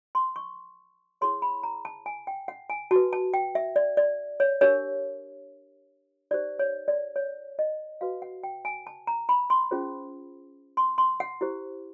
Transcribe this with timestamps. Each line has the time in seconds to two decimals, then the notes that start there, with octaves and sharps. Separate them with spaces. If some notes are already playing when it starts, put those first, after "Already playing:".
0.15 C6
0.36 C#6
1.21 E4 G#4 C#5 C6
1.42 B5
1.63 A#5
1.85 A5
2.06 G#5
2.27 G5
2.48 F#5
2.70 G#5
2.91 F#4 B4 A5
3.13 A5
3.34 G5
3.55 E5
3.76 D5
3.97 D5
4.40 C#5
4.61 D4 G4 A#4 C#5
6.31 D#4 G4 C5 D5
6.59 C#5
6.88 D5
7.16 C#5
7.59 D#5
8.01 F#4 B4 F5
8.22 F#5
8.43 G5
8.65 G#5
8.87 A5
9.07 A#5
9.29 B5
9.50 C6
9.71 C#4 F4 G#4 C5
10.77 C6
10.98 C6
11.20 F#5
11.41 E4 G4 C5